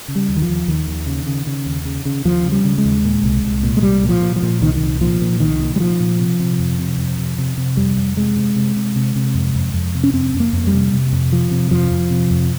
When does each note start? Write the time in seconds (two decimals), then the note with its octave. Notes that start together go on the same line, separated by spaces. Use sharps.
0.08 C#3
0.15 G3
0.29 D#2
0.37 D#3
0.42 F3
0.48 D#2
0.68 D#2 D#3
0.87 D#2
1.07 C#3
1.26 C#3
1.47 C#3
1.66 D#2
1.85 C#3
2.05 C#3
2.25 D#2 F3
2.45 C#3
2.52 G3
2.64 C#3
2.78 G#3
2.85 D#2
3.05 A#2
3.23 C2
3.44 C2
3.63 A#2
3.77 G#3
3.82 C2 G3
4.03 A#2
4.09 F3
4.22 A#2
4.36 F3
4.43 A#2
4.62 C2 D#3
4.76 D#3
4.81 C2
5.01 A#2 F3
5.21 A#2
5.40 C2 D#3
5.60 A#2
5.76 G3
5.80 A#2 F3
6.00 A#2
6.19 C3
6.40 C3
6.59 F2
6.79 C3
6.98 F2
7.18 C3
7.38 C3
7.58 C3
7.77 F2 G3
7.97 F2
8.16 C3 G#3
8.37 C3
8.56 C3
8.76 C3
8.96 C3
9.16 C3
9.35 F2
9.55 F2
9.74 F2
9.95 C3
10.03 C#4
10.13 F2 C4
10.34 F2
10.40 A#3
10.53 F2
10.67 G3
10.73 C3
10.93 C3
11.12 F2
11.32 C3 F3
11.51 C3
11.71 F2 F3
11.91 F2
12.11 C3
12.31 F2